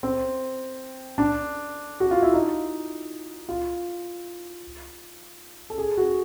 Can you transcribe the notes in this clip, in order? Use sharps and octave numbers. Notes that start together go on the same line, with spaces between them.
C4
D4
F#4
F4
E4
D#4
F4
A4
G#4
F#4